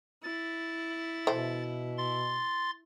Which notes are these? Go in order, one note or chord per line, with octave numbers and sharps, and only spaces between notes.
E4 A6
B2 E3 A4 C5
C6 A6